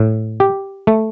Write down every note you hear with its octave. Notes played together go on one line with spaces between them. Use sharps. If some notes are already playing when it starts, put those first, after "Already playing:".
Already playing: A2
G4
A3